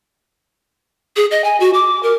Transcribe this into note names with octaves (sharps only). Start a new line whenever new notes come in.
G#4
D#5
G#5
F#4
D6
A#4